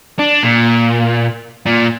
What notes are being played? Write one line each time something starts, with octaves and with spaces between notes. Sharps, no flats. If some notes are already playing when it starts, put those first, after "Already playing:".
D4
A#2
A#2